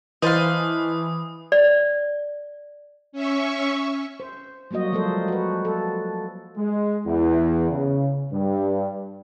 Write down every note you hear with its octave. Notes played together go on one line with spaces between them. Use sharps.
E3 B4 C5 D#5 F5 A5 D#6
D5
C#4 E5 C#6
C5
F#3 G3 A#3 F#4 D#5
F3 G#3 A#3 A4 C5
F#4 B4
A4
G#3
E2
C#3
G2